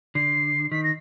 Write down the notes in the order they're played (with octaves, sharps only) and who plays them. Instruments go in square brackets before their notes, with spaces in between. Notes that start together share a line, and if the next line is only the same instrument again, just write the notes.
[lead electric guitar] D3 [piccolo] C7
[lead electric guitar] D#3 [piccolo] B6
[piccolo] A#6